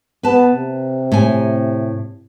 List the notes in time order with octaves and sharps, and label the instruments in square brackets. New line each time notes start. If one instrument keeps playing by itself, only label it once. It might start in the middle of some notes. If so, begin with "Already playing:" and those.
[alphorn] B3 [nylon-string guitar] B4 A5
[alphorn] C3
[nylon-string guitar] A2 G#5